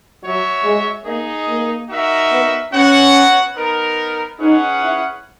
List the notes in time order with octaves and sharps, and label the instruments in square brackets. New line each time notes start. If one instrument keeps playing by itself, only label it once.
[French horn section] F#3 [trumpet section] F#4 C#5 E5
[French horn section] G#3
[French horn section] A#3 [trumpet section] D#4 G#4 D#5
[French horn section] A#3
[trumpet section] D#4 F#4 A#4 E5
[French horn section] B3
[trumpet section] B3 F#4 C#5 F#5 [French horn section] C#4
[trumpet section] B3 D#4 A#4
[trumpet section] C#4 G#4 B4 F#5 [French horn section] D#4
[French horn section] E4